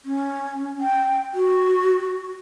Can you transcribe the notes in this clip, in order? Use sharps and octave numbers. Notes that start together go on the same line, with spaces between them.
C#4
G5
F#4